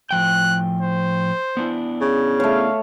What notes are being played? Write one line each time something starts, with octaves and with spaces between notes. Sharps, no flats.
A2 F3 G5 F#6
C5
B3 D4 E4
C#3
A3 C#5 F5